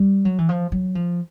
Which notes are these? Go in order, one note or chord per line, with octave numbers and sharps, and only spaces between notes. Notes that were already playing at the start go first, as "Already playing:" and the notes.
Already playing: G3
F#3
E3
F3
F#3
F3